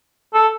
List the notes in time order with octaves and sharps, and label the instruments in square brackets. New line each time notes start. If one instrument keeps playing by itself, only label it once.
[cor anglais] A4